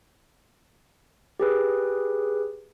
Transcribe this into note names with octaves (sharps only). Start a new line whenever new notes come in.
G4 G#4 B4